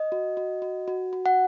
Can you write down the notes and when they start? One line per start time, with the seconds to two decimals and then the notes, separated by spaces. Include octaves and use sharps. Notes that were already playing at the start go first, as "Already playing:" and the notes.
Already playing: D#5
0.12 F#4
0.37 F#4
0.62 F#4
0.88 F#4
1.13 F#4
1.26 F#5